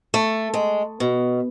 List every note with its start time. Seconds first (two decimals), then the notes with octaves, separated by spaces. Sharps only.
0.14 A3
0.54 G#3
1.00 B2